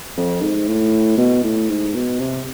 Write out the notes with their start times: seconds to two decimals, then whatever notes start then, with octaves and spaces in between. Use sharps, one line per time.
0.17 F2
0.42 G#2
0.68 A2
1.17 B2
1.43 A2
1.69 G#2
1.94 B2
2.19 C3